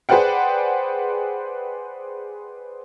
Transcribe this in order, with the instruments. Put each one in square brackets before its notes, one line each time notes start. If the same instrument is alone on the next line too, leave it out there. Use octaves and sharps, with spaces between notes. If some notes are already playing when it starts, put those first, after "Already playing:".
[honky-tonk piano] G#4 B4 C5 D5 F#5 G5